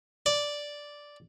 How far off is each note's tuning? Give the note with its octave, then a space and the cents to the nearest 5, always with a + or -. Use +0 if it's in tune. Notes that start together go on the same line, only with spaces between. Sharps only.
D5 -5